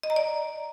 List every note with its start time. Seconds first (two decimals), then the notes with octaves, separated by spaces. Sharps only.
0.03 D#5
0.10 A#5
0.16 D5